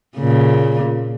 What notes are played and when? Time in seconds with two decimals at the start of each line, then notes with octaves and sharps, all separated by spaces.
0.18 A#2 C#3